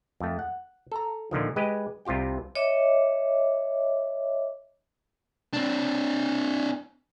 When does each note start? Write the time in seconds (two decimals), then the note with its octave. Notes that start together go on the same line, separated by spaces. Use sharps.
0.20 F2 A3
0.39 F#5
0.92 A4 A#5
1.31 A#2 D3 D#3 F3
1.56 G#3 G4 B4 D#5
2.05 C2 C3 F4 G4 G5
2.55 C#5 D#5 E5 D6
5.53 C4 D4